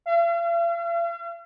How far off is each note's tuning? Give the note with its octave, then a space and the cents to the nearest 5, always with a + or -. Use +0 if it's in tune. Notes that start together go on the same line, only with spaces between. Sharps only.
F5 -45